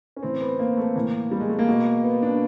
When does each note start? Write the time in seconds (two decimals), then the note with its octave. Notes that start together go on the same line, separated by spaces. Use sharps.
0.16 C#4
0.23 A2 E3 C4
0.41 B3
0.59 A#3
0.77 A3
0.96 A2 E3 A#3
1.31 G3
1.40 G#3
1.49 A3
1.59 A#3
1.68 B2
2.04 B3
2.22 D4